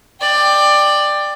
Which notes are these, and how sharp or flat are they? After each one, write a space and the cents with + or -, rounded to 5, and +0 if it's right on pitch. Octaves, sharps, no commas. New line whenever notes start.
D5 +15 G5 +10